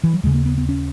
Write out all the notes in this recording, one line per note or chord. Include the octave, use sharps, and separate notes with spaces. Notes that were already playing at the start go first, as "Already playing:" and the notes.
E3
F#3
D#2 C#3 G#3
A#3
B3
B3
C#4